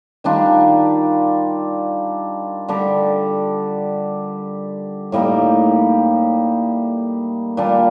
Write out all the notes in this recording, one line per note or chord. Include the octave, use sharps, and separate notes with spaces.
D#3 G3 D4 F4
D3 G3 D4 G4
A2 G3 A#3 D#4
A#2 G3 D4